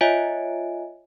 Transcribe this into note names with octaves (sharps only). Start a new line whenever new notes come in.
F4 C#5 D#5 E5 G#5 D7